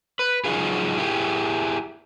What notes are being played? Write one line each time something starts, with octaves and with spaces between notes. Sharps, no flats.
B4
F#3 D#4 F4 G#4
E4 G4 G#4